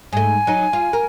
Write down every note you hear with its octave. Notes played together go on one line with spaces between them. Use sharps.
G#2 A3 G#5
F#3 D#4
F4
A#4